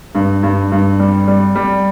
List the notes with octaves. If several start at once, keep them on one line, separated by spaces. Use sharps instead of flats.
G2
G2
G2
G3
G3
G3